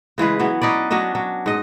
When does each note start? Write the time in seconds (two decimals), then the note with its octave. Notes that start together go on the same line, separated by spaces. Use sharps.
0.18 C#3 E3 G#3 B4
0.39 E3 F#3 B3
0.61 C#4 D#4 B4 D5
0.91 F#3 C#4 D4 D#5
1.15 F#3
1.46 G#2 D#5